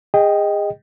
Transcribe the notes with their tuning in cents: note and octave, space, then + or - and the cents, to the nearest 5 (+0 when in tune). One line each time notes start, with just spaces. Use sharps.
G#4 -30 D#5 +0 G5 +0